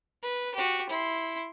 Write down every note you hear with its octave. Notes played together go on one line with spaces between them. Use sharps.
B4
F#4 G4
E4 C6